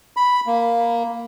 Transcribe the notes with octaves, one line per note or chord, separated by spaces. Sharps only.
B5
A#3